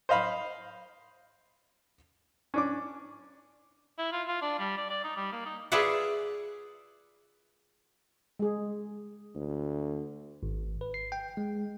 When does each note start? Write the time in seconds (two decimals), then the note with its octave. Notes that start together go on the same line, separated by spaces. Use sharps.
0.09 C5 D#5 F5 B5
2.54 C#4 D4 D6
3.98 E4
4.12 F4
4.28 F4
4.42 D4
4.59 G3
4.77 D5
4.90 D5
5.04 D#4
5.16 G3
5.32 A#3
5.45 D#4
5.72 F4 G#4 B4 D5 E5 F#5
8.39 G#3 G#4
9.35 D2
10.43 G#1
10.81 B4
10.94 C7
11.12 G5
11.37 G#3